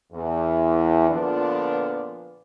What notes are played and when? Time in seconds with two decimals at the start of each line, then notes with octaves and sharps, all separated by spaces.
0.13 E2
1.09 A#2 D3 F3 B3 D4